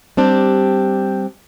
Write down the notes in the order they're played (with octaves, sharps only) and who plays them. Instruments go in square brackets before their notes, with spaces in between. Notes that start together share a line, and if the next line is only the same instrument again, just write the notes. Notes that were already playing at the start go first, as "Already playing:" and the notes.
[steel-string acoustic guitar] G3 C4 D4 G4